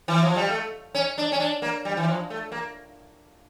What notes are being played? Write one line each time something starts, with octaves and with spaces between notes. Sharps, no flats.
E3
F3
G3
A3
C#4
D4
C#4
D4
A#3
G3
E3
F3
A3
A#3